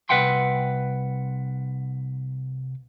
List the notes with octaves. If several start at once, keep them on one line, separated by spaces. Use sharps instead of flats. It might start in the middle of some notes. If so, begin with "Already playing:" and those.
C2 B4 E5 F#5 G5 C6